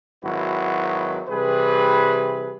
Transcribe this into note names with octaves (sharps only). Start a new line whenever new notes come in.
G#1 D#3 F#3 E4 F#4 B4
C3 E3 G3 G#4 B4